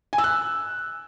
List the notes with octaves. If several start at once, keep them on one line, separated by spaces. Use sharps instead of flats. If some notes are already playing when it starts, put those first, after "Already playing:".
G#5
E6
F#6